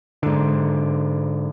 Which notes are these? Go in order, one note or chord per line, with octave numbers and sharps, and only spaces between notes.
G#2 D3